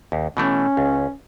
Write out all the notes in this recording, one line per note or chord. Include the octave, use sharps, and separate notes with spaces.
D#2
B2 E3 A3 C#4
C#2